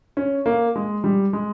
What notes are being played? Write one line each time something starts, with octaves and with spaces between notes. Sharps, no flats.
C#4
A#3
G#3
G3
G#3